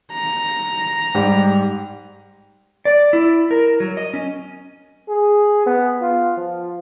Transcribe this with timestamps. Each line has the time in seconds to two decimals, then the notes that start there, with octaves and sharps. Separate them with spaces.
0.12 A#5
1.15 G#2 G3
2.85 D5
3.13 E4
3.51 A#4
3.80 F#3
3.97 D#5
4.14 C#4
5.08 G#4
5.66 B3
6.02 F4
6.37 F3